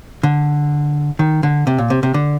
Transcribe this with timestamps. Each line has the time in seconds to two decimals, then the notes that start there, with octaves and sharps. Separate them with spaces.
0.23 D3
1.19 D#3
1.43 D3
1.67 C3
1.78 A#2
1.90 C3
2.03 C3
2.14 D3